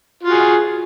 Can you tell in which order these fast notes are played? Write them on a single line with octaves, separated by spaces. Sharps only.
F4 F#4 G#4